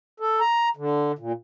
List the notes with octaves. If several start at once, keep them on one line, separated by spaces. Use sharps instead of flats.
A4
A#5
D3
A#2